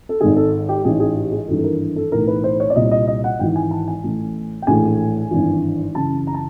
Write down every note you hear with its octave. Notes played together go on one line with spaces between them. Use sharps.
A4
G#1 G#2 D#3 G#4
A4
G4
A1 G#2 E3 G#4
G#4
G4
G#4
G#1 G2 E3 A4
A4
A#4
A4
B1 A2 E3 A#4
B4
C5
C#5
D5
C2 A#2 D#5
D#5
D#5
F#5
G#1 G#2 E3 G5
G#5
A5
G#5
A1 A2 E3
G5
A#1 A2 E3 G#5
G#1 G2 E3
F#1 F#2 C#3 E3 A5
A#5
A5